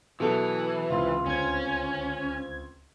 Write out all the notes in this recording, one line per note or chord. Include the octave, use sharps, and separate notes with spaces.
B2 E3 F#3 A4
C#2 C3 F4
D2 C4 C#4 G#6